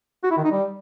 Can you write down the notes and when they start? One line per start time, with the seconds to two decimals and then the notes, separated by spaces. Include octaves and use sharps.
0.24 F#4
0.30 E4
0.37 D#3
0.44 D#4
0.51 G3